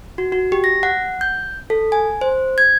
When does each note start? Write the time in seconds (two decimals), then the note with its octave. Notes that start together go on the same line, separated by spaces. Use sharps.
0.18 F#4
0.32 F#4
0.52 G4
0.64 A#6
0.83 F#5
1.21 G6
1.70 A4
1.92 G#5
2.21 C5
2.58 G#6